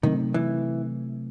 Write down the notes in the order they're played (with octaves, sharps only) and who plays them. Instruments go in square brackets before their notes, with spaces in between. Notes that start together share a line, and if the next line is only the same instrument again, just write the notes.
[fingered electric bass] C3 F#3 A3 C4 [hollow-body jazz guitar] D#3
[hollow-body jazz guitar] E3